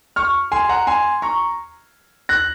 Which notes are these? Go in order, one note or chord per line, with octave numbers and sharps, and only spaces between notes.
C#6 F6
G#5 C6
F#5 A#5
G#5 C6
A#5 C#6
F#6 A#6